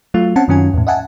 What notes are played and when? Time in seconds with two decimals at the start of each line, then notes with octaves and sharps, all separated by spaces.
0.14 F#3 A3 F4
0.36 C4 C#4 F#5 A5
0.48 F#2 D#3 F#3 C#4 F4 G#5
0.74 E2 A2
0.87 D#5 E5 F#5 G#5 A5